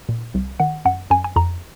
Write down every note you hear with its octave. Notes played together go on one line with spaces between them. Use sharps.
A#2
C2
D#3 F#5
F#2 F#5
F#2 G#5
G#5
F2 A#5